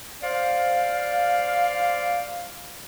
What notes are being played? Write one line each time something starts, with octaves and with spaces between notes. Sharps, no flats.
C5 D5 F5